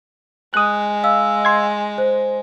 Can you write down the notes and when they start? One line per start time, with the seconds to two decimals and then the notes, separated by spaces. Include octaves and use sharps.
0.54 G#3 D#6 F#6
1.03 D#5 F5 E6
1.45 C6 G#6
1.98 C5